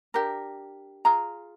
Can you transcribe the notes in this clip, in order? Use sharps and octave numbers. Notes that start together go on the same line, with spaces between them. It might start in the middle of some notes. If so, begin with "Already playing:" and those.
D4 G4 A#4
F4 G#4 A#5